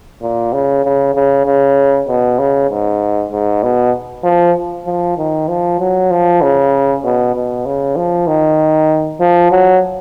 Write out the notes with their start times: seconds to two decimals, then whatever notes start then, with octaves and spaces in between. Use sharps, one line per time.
0.22 A#2
0.53 C#3
0.85 C#3
1.14 C#3
1.46 C#3
2.08 B2
2.39 C#3
2.70 G#2
3.32 G#2
3.63 B2
4.24 F3
4.86 F3
5.18 D#3
5.48 F3
5.79 F#3
6.11 F3
6.42 C#3
7.04 B2
7.35 B2
7.66 C#3
7.96 F3
8.27 D#3
9.20 F3
9.51 F#3